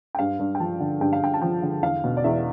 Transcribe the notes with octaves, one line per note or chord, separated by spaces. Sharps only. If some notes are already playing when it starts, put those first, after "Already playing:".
G5
G2 F5
G2
G5
F3 A5
D3
G2 G5
F5
G2 G5
A5
F3 G5
D3
E2 F5
B2
D5
E2 E5